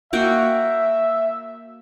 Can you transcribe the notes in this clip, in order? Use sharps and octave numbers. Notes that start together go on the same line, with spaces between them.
A#3 F#4 E5 G5